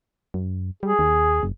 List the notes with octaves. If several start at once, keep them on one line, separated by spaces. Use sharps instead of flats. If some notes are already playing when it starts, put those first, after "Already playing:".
F#2
G3 G#4
D#2
F#1